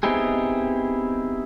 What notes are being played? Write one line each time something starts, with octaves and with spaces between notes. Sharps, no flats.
B3 C4 D#4 E4 G4 G#4